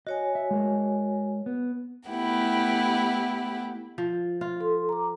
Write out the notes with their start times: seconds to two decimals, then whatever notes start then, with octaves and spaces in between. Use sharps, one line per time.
0.07 F#4 C#5 D#5 G#5
0.35 E5
0.51 G#3 A#4
1.46 B3
2.09 A3 B3 E4 G4 F#5
3.98 F3
4.41 F4
4.60 A4 C6
4.89 A#5 D6